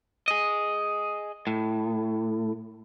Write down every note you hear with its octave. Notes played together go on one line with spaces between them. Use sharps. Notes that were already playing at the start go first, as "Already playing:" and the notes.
G#4 D#5
A2